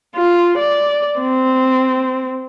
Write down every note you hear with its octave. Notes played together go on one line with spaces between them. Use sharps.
F4
D5
C4